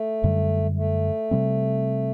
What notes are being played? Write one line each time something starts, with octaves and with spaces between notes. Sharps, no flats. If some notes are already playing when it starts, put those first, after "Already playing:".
Already playing: A3
F#2 D3 G3
A3
C3 G3 C4